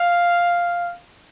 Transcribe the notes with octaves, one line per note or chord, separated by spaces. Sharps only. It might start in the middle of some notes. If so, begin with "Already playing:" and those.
Already playing: F5